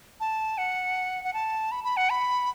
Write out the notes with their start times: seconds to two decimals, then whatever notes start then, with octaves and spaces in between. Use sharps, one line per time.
0.20 A5
0.58 F#5
1.24 F#5
1.34 A5
1.72 B5
1.84 B5
1.97 F#5
2.10 B5